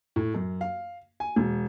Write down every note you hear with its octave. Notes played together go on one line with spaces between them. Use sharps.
A2
F#2
F5
G#5
E1